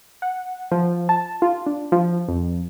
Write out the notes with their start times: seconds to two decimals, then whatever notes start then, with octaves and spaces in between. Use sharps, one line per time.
0.22 F#5
0.71 F3
1.09 A5
1.42 F4
1.66 D4
1.92 F3
2.28 F2